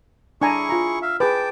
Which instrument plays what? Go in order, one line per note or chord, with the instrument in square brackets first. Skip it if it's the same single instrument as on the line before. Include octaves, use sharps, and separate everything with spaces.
[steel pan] D4 G#5 A#5 [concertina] E4 G#4 C#6
[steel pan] F4 A#5
[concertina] E5 F5
[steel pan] G#4 B4 [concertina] G5 A5 D6